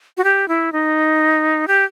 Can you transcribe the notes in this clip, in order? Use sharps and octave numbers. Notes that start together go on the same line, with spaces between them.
F#4
G4
E4
D#4
G4